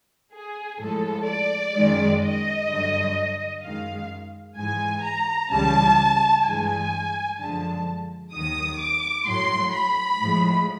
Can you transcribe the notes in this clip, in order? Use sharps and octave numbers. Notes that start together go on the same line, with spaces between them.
G#4
A2 F3 G#3 A4
D5
F#2 D#3 G#3
D#5
G2 D3 F#3
F#2 D#3 G#3 F5
G#2 E3 G#3 G#5
A#5
C#2 C#3 E3 G3 A5
G2 E3 G#3 G#5
F#2 D3 F3 G#3 A5
D#2 D#3 F#3 D#6
D6
A2 F#3 C6
B5
A2 F3 G#3